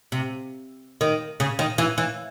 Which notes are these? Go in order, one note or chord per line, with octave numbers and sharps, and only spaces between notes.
C3
D#3
C#3
D#3
E3
E3